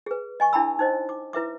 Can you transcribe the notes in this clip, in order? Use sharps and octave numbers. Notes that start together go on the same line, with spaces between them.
G#4 B4
D#5 G#5 C#6
D4 E4 G5 A5 B5 E6
D#4 C5 D#5
D6
E4 B4 E5 D6